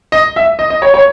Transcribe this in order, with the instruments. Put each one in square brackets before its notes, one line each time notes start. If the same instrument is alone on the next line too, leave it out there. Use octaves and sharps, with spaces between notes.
[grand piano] D#5
E5
D#5
D#5
C#5
C#5